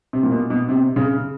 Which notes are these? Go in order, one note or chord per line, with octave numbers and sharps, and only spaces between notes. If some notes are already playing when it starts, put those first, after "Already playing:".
C3
A#2
B2
B2
C3
C#3